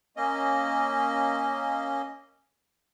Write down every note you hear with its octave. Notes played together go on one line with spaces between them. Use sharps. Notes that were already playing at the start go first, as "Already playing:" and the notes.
A#3 C#4 D#5